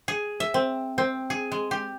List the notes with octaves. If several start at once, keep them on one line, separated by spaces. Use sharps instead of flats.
G#4
E5
C4
C4
G#4
G#3
G4